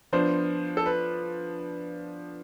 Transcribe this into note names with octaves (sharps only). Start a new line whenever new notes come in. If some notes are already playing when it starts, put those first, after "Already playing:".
F3 B3 D4 C5
A4
B4